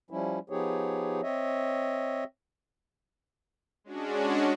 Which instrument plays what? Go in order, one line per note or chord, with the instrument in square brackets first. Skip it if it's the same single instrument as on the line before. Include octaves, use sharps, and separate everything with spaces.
[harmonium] F3 G3 C#4 E4
F3 B3 D#4 G4 G#4 C#5
C4 C#5 D#5 E5
[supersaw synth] G#3 C#4 D4 F#4